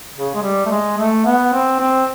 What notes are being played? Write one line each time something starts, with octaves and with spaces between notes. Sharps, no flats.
C#3
G#3
G3
A3
G#3
A3
B3
C4
C4